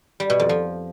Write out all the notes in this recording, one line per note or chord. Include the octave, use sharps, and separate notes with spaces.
G3
B2
F2
F3